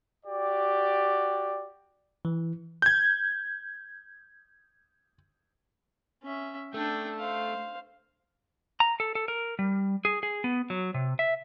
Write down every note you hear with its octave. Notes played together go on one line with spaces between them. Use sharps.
F#4 G4 D5
E3
G6 G#6
C#4 E5
A3 D4 G5
C5 F5
A#5
A4
A4
A#4
G3
G#4
G#4
B3
F#3
C3
E5